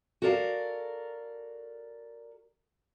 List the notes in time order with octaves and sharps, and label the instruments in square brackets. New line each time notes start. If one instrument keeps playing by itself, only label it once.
[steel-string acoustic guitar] F#4 A4 A#4 D5 F5